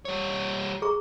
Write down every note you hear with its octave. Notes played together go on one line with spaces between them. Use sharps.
G3 C#5
G#4 A#5 C#6